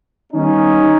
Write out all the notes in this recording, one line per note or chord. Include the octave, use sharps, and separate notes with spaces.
D#3 G3 B3 C#4 D#4